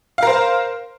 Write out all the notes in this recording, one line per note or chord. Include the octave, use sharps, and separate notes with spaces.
A#4 C5 F5